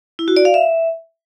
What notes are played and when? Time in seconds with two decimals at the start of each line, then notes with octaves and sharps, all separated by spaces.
0.19 E4
0.28 F#4
0.37 D5
0.45 F5
0.54 E5